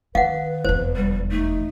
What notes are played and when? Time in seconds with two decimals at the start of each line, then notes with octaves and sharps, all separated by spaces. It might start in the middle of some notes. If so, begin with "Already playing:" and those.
0.15 D#3 B4 F5 F#5
0.65 F1 E2 C5
0.96 G3
1.31 A3 D#4